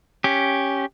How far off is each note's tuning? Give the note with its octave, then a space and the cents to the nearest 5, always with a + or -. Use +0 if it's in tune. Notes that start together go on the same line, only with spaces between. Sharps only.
C#4 +0 G4 +0